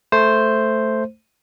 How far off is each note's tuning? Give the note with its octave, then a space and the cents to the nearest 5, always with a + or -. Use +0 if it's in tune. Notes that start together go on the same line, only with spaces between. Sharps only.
A3 +0 C5 +0